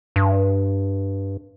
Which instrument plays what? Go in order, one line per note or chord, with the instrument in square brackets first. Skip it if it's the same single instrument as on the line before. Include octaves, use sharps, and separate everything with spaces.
[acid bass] G2